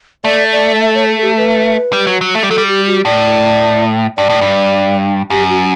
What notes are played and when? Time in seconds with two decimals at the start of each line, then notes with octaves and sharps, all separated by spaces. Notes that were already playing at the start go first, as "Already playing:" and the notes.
0.24 A3 D5
0.52 D5
0.80 E5
0.95 C#5
1.08 A4
1.22 G4
1.37 B4
1.93 G3
2.07 F#3
2.21 F#3
2.35 A3
2.43 G3
2.50 F#3 A4
2.58 G3
2.68 G4
2.87 F#4
3.05 A2 D5
4.17 G2 D5
4.30 A2
4.41 G2
5.30 F#2 G4
5.50 F#4